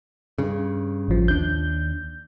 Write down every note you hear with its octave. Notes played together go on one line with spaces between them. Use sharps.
G2 C#3
A1 F3
D#2 D4 G6